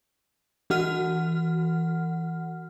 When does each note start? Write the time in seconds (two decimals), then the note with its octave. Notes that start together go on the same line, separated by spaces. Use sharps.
0.70 E3 F#4 F#5 F6